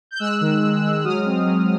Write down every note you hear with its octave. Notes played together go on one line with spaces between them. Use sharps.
G6
G#3 E6 F#6
D#3
G#3
G#3
F#3 D#6 F6
C4
F#3